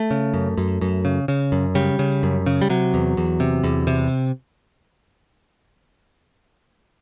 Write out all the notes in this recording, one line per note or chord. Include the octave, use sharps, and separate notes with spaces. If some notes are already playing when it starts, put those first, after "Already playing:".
Already playing: A3
C#3
F#2
F#2
F#2
C#3
C#3
F#2
C#3 G3
C#3
F#2
C#3
G3
C3 F#3
E2
E2
C3
E2
C3